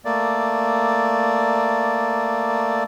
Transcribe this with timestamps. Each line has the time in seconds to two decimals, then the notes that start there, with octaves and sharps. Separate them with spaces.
0.05 A3 A#3 D5